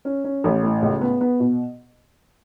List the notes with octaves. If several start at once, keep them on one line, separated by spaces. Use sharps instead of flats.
C#4
C#4
A1
A2
C#2
B3
B3
B2